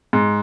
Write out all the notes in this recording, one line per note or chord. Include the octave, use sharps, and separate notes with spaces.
G#2